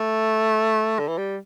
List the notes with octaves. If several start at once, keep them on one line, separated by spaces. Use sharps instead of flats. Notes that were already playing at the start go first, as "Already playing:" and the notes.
Already playing: A3
D3
E3
G3